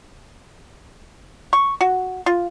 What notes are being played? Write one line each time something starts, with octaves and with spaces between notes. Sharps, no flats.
C#6
F#4
F4